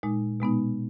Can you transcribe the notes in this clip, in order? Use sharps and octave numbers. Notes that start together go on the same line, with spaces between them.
A#2 G#3 D#4
B2 G#3 B3 D#4